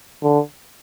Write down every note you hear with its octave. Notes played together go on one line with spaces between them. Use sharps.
D3